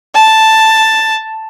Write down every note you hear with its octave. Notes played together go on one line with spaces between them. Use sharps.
A5